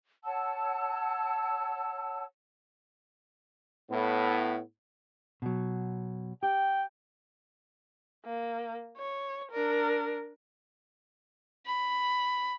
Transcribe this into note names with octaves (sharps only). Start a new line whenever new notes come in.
C#5 F#5 A5 E6
A2 B3
B2 F#3
G4 G5
A#3
C#5
D4 A#4
B5